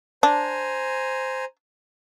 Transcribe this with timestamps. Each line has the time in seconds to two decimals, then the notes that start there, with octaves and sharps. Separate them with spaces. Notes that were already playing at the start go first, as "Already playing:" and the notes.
0.23 D4 C5 G#5 A#5